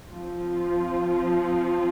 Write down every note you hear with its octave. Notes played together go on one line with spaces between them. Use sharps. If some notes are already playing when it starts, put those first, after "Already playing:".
F3 C4 F4